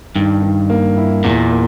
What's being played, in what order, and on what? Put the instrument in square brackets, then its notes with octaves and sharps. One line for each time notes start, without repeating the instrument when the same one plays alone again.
[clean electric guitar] G2 [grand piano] D#3
[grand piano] D#3
A#3
E4
[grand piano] E2 [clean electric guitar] A#2
[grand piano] A#3